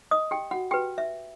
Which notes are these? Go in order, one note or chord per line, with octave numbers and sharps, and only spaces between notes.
D#5 D#6
G4 G5
F#4 F#5
F#4 G4 B4 G5
E5